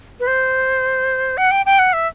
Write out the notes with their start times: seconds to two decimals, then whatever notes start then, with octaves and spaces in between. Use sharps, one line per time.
0.20 B4
0.27 C5
1.37 F#5
1.51 G5
1.66 G5
1.79 F#5
1.93 E5